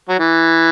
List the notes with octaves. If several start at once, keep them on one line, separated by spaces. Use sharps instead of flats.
F#3
E3